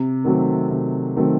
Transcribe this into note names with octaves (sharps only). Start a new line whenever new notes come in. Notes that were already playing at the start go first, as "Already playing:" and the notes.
Already playing: C3
D#3 F#3 A3 C4
C3
D#3 F#3 A3 C4